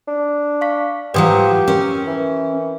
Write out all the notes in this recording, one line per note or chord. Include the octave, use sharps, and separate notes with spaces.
D4
F5 C#6 B6
G#2 F3 F#3 G4 B4 D#6
C#4 A#4
E3